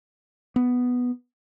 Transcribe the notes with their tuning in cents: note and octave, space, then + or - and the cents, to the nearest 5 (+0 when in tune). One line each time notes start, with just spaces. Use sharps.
B3 +0